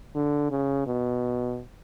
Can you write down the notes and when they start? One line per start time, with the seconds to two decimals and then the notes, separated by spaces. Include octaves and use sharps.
0.15 D3
0.51 C#3
0.86 B2